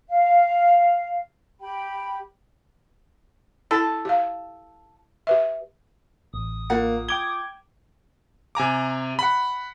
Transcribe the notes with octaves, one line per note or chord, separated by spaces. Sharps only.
F5
G4 G5 B5
E4 A4 A5
G4 F5
G4 B4 E5
A1 D#6
A#3 F4 F#5
G5 D6 G#6 G7
C3 G#5 A#5 D6
F#5 B5